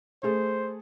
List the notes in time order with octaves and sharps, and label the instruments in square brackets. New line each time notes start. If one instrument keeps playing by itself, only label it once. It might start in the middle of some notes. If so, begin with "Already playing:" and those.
[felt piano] A3 G#4 A4 [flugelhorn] C5